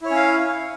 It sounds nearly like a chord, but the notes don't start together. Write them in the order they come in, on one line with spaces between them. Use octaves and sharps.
E4 C#5 C#4 F5